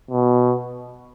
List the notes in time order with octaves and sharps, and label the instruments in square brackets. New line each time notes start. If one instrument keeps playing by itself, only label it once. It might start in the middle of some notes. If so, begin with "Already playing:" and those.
[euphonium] B2